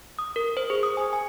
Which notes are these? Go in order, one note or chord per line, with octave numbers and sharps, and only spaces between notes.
D#6
A#4
C5
G#4
D#6
G#5
G#5